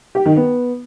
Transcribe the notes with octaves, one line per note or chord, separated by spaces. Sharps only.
G4
D#3
B3